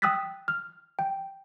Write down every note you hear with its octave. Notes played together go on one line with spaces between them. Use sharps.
G5 D#6 E6 F#6 A6 B6
F6
G5